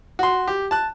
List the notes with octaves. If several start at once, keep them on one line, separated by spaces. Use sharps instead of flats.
F#4 C6
G4
A5 F#6